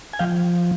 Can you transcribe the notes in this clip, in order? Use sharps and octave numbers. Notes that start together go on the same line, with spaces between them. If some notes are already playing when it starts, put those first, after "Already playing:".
G#5
F3 F5 G5